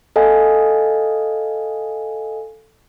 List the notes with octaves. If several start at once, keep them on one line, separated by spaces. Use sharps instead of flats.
A4 D#5 F5 G#5